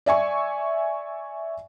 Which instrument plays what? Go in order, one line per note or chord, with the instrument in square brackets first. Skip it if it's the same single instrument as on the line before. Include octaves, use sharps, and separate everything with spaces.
[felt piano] D5 E5 G#5 C#6